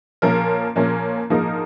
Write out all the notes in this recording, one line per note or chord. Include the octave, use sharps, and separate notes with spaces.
A#2 F3 C#4 A#4
A#2 F3 C#4 A#4
G#2 F3 A#3 D#4 A#4